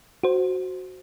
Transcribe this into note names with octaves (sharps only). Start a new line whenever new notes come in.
F#4 C5